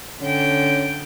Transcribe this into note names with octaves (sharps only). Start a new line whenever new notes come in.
D3 C#4 G5